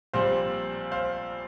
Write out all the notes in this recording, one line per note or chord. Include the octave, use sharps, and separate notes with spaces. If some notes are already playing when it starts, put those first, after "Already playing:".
A#1 A#2 G3 C4 C5 F5
C5 F5